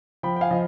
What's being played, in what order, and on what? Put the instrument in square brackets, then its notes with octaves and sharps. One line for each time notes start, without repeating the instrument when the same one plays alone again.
[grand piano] F3 G5 B5
G5
F5 G#5
F3 D#5